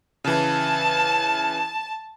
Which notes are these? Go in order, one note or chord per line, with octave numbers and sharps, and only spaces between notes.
C#3 E3 A5